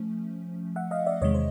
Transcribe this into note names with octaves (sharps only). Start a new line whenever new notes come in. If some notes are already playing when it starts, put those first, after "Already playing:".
Already playing: F3 A3 C#4
E5 F#5
D#5 F5
D5 E5
E2 C3 D#3 G#3 C#5 D#5
C5